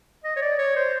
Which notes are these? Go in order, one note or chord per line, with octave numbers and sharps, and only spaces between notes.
D#5
C#5
D5
C#5
C5